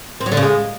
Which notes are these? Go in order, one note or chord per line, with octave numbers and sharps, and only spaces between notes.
C4
F#3
D3
C#3
G#3